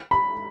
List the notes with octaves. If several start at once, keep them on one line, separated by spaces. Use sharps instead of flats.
B5